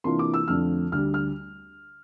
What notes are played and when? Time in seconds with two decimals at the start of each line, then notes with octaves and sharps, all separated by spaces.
0.04 C3 E3 A#3 D4 F4 C6
0.19 D6
0.34 E6
0.48 F2 D3 F3 A3 D4 F6
0.92 D2 D3 G3 F6
1.14 F6